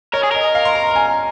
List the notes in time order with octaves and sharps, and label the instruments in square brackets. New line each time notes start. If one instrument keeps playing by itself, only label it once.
[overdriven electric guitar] A#4 [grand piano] C#5
[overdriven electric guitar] G#4
[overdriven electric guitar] A#4 [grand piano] D#5
[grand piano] F5
C6
A#5
A#5
G#5